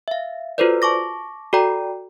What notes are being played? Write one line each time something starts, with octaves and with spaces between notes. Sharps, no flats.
E5 F5
F4 F#4 A4 B4 C5 D5
A5 C#6 D6 A#6
F#4 A4 D5 G5 A#5